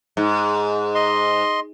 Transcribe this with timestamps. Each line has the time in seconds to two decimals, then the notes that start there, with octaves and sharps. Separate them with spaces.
0.17 G#2
0.95 D#5 C6